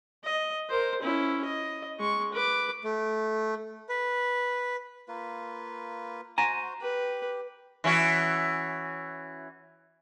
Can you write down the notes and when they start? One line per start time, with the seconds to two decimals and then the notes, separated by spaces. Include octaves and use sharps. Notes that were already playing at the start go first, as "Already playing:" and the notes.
0.24 D#5
0.69 A#4 C5
1.02 C#4 E4
1.44 D#5
1.99 G#3 C#6
2.32 B4 D6
2.83 A3
3.89 B4
5.08 A#3 F4 B4
6.38 F#4 C5 G#5 A#5
6.81 G4 B4
7.84 E3 C#4 F#4